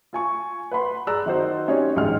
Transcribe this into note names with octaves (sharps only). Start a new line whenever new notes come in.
F4 G#5 C#6
B4 F#5 B5 C6
G#4 D5 A#5 E6 F#6
D#3 D#4 F#4 C5
C#4 D#4 G4 C#5 D5
A1 D2 G#2 G#4 F6